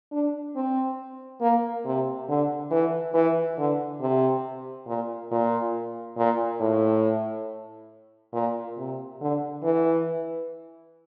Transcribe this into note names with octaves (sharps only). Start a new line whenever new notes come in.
D4
C4
A#3
C3
D3
E3
E3
D3
C3
A#2
A#2
A#2
A2
A#2
C3
D3
E3